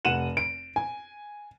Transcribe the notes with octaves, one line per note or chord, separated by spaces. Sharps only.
F1 F#5 D#7 E7 F#7
D7
G#5